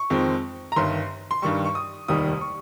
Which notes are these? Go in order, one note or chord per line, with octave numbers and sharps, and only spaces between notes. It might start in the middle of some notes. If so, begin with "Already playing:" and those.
Already playing: C#6
F2 D#3 G#3 C4
A#5
G1 G2 D#3 C6
C6
G2 D#3 G3 C#6
C#6
D#6
F1 D#2 D#3 G3 D#6
C#6